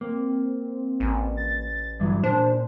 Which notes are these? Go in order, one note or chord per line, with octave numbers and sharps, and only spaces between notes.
A#3 C4
A1
A6
G2 E3 F#3 G3
A#2 D4 C5